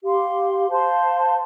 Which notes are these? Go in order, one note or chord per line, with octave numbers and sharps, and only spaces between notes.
G4 F5 C6
C5 F5 A5 C6